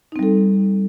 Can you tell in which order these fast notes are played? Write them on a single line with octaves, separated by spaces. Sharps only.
D#4 C4 G3 A4